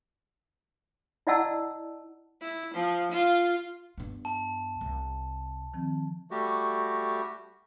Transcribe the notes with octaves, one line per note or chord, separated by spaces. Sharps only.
E4 D5 D#5 F#5 A5 E6
E4
F3
F4
G2 B3
A5
C2
D#3 F3 C4
G3 A3 F#4 G4